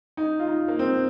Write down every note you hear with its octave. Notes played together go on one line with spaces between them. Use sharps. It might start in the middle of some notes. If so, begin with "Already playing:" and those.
D#4
F4
D#4
A#3
C4